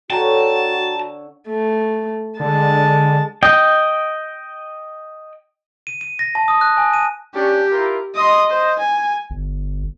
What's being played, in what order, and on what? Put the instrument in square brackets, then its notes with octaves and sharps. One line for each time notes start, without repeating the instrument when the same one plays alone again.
[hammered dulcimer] D3 C#5 [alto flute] F#4 [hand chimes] G5 A#5 [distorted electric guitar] A5
[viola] A3
[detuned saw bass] D3 [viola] G#3 A5
[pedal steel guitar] D#5 G5
[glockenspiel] D#7
D#7
A#6
A5
D#6
F#6
G#5
D#7
[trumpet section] C#4 D4 [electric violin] G4
[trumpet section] E4 F4 A#4
[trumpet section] D#5 [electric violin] C6 D#6
[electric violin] C5
G#5
[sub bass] G1